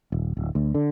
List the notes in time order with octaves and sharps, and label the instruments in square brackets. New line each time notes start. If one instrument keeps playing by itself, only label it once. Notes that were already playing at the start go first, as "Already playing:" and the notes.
[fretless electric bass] D#1
D1
D2
D3